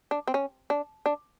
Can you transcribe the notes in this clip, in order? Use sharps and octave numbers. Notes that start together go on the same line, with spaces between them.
D4
C4
C#4
D4
D4